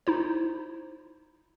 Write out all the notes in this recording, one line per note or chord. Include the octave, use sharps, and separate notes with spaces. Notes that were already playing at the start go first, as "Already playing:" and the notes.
D#4 E4 C5